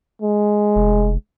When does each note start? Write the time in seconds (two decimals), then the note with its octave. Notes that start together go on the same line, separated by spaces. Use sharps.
0.22 G#3
0.76 F1